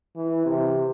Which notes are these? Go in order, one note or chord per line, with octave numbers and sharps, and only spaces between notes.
E3
C3